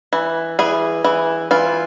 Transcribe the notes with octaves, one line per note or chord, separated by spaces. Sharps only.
E3
E3 G#4
E3
E3 F4